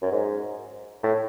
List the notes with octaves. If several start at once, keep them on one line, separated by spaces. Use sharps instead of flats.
F#2
G#2
A2